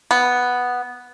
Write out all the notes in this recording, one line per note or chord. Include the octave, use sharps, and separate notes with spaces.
B3